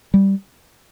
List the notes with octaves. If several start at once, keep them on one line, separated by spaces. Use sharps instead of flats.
G3